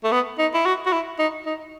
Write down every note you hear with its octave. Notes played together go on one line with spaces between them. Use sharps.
A3
B3
D#4
E4
F#4
F#4
E4
D#4
D#4